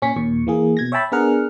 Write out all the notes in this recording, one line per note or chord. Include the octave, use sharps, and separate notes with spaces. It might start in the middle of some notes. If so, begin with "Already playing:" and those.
A#2 C#4 C#6 B6
D#2 A#2 C#6
E3 A#3 G#4
B2 G#6 A#6
C#5 E5 G5 A5 B5
B3 D4 G#4 A#4 F#5 F6